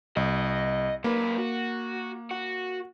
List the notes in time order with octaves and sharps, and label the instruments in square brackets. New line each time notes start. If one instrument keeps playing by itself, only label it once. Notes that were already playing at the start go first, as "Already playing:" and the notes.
[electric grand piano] C2 [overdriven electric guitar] D#5
[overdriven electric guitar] F#2 B4 [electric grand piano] A#3
[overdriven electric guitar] F#4
F#4